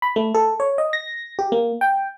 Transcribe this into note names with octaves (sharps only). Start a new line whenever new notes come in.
B5
A3
A4
C#5
D#5
A#6
G4
A#3
G5